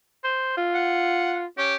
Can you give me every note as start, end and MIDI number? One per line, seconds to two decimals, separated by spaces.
0.24 0.52 72
0.57 1.46 65
0.74 1.39 78
1.58 1.76 61
1.58 1.75 67